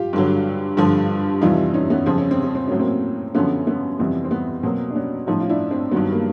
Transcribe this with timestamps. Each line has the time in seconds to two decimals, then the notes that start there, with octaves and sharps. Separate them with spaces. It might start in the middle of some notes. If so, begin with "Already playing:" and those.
Already playing: F4 G4
0.13 G2 D3 F#3
0.77 G2 D3 F3
1.41 F2 C3 E3 G3 D#4 F4
1.74 C#4 D#4
1.90 B3 C#4
2.06 F2 C#3 F3 C4
2.18 C#4
2.31 C4
2.43 C#4
2.55 C4
2.68 A2 F#3 C#4
2.79 A#3 C4
3.35 F#2 D3 F3 B3 C#4
3.67 B3 C#4
3.99 F2 C3 E3 G3 B3
4.24 C4
4.31 B3
4.63 B2 F#3 A#3 C4
4.90 D4
4.95 B3 C#4
5.27 A2 F3 C#4 D#4
5.40 F4
5.49 D4 E4
5.71 C4 D4
5.91 G2 D#3 F#3 B3
6.12 A#3